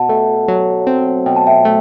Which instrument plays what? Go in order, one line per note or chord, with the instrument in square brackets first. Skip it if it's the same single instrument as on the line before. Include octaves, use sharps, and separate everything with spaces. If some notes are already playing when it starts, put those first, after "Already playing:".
Already playing: [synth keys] B2 [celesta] F#5 A5
[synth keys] A3
F#3
C4
[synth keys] B2 [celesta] G5
[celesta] A5
E5 G5
[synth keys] A3